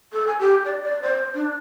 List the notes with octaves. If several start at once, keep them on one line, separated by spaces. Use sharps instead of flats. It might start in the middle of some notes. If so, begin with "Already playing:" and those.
A4
G#5
G4
D5
D5
C5
D4